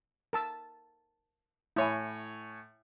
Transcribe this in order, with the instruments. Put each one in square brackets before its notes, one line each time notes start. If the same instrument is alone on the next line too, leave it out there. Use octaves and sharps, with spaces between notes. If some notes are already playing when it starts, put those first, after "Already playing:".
[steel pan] A#4 A5 E6
[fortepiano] A2 C#5 G#5 [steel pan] E4